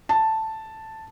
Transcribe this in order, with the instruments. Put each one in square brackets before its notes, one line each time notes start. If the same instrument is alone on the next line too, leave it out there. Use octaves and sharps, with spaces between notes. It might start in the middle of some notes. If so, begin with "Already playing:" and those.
[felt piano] A5